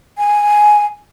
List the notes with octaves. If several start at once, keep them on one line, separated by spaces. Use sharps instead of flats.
G#5